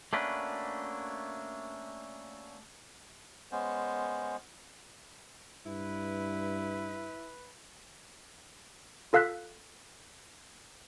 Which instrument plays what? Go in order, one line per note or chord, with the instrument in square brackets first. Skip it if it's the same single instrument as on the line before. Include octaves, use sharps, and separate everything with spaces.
[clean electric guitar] A3 A#3 C#4 D4 F#4 B4
[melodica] G#3 B3 C#4 C5
[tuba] G2 [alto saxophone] E4 [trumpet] B4
[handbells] F4 A4 F5 E6 F#6 B6